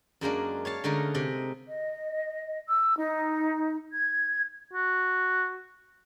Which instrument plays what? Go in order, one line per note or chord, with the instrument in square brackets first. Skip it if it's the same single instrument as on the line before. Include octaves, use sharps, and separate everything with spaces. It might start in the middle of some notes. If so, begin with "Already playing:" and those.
[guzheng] F#2 G#3 A#3 D4
C#5 F5 A5
D3 G#3 A3 C#4 D#4 A#4
C3 D#5
[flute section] D#5
E6
D#4
G#6
[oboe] F#4